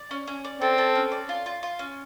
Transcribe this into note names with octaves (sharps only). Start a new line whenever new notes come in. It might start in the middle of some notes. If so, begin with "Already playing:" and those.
Already playing: D5
C#4
C#4
D5
C4 A4
A4
C#4
D5
F4
F4
F4
C#4